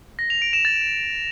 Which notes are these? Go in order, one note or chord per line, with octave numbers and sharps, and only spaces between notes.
A#6
F7
D7
E7
A6